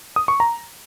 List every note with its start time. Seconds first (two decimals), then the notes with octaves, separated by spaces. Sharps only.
0.16 D#6
0.28 C#6
0.40 A#5